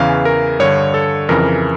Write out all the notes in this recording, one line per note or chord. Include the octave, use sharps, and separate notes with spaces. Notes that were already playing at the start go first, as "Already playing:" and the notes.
Already playing: E2 C#3 E3 F5
A#4
G2 D3 C#5
A4
F2 C#3 E3 A#4